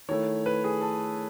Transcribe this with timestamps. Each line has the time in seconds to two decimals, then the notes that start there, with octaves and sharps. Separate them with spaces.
0.08 D#3 A3 E4 C#5
0.46 B4
0.64 G#4
0.81 A4